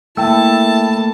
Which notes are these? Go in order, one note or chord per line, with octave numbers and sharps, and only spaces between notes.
A3 A#3 E4 G5 A5 E6